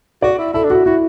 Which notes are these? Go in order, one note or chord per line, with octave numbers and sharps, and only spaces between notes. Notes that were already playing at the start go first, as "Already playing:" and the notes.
F#4 D5
E4
E4 A4
D4
E4 F#4
E4 F#4